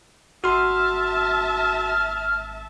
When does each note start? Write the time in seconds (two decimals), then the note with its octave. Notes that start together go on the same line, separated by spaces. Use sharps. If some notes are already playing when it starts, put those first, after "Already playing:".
0.44 G#1 F#4 E5 A5 C6 F6